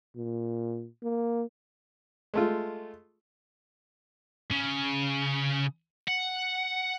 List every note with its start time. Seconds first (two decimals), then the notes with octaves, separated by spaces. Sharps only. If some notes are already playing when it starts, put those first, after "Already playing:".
0.16 A#2
1.03 A#3
2.34 G#3 A3 F4
4.51 C#3
6.08 F#5